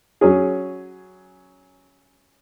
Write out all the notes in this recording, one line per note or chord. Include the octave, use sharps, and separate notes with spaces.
F#3 C#4 G#4